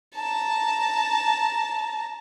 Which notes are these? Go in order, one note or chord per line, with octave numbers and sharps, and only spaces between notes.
A5 A#5